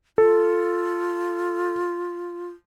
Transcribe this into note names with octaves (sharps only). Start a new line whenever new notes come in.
F4 A4